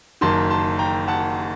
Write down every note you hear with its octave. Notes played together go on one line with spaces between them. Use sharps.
F#1 F#2 D#3 A5 C6
A5 C6
G5 A#5
F#5 A5